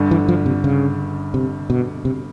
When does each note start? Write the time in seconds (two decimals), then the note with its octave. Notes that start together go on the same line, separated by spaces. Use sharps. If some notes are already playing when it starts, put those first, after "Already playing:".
Already playing: G1 G2 D3
0.11 E3
0.28 F3
0.46 C3
0.64 C#3
1.34 C3
1.70 B2
2.05 C3